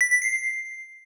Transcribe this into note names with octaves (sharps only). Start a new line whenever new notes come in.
B6
B6
C7